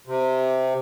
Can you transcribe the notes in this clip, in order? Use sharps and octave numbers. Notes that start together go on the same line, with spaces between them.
C3